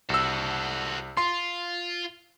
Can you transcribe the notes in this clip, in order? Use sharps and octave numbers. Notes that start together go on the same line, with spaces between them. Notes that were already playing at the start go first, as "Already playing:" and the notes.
C2 F#4 A4 E6
F4 C6